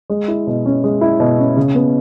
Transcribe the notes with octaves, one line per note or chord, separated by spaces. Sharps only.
G#3
E4
B2
C#4
G#3
E4
B2
C#4
C#3
B3